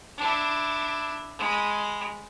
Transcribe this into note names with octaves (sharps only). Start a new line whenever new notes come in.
D4 E4
G#3 B5